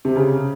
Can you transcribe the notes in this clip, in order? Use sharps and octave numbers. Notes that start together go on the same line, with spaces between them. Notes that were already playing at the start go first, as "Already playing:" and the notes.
C3
C#3